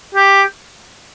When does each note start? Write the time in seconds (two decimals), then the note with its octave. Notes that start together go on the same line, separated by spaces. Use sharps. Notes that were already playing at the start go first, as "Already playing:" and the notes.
0.15 G4